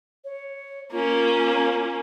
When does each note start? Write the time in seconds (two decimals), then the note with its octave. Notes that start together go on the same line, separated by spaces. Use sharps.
0.24 C#5
0.92 A#3 C#4 F4